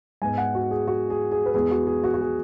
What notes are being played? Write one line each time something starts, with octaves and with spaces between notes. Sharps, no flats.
G#2 G#3 B3 G#5
F#5
F#4
G#4
F#4
G#4
G#4
B4
E2 E3 G#3 B3 G#4
F#4
G#4
F#4
F#4
G#4